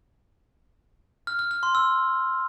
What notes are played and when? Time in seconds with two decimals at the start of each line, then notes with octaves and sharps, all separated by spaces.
1.27 F6
1.39 F6
1.51 F6
1.63 C6
1.75 E6